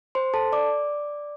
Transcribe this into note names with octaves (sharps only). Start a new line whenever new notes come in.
C5 C6
A4 A5
D5 D6